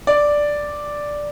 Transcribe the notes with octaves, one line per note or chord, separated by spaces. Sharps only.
D5